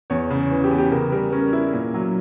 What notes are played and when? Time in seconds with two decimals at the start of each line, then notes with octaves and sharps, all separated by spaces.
0.10 E2 C#5
0.30 C#3
0.51 E3
0.64 G4
0.71 B3
0.78 G4
0.91 C#3 A#4
1.12 G3 A#4
1.32 C#4 A#4
1.53 E4
1.73 A#2
1.94 F#3